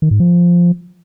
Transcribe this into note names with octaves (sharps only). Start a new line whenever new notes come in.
D#3
G#2
F3